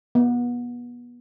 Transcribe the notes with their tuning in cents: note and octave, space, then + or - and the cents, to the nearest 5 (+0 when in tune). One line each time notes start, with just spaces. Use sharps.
B3 -30